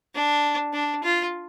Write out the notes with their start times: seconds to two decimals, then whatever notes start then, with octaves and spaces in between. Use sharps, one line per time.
0.15 D4
0.73 D4
1.03 F4